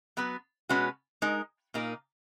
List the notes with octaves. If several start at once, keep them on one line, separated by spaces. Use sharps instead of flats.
F#3 B3 F#4 B4
B2 G#3 C#4 F#4 B4
G#3 D#4 A#4
A#2 A#3 D#4 A#4